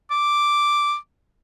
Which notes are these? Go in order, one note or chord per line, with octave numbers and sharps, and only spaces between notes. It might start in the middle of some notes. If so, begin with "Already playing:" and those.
D6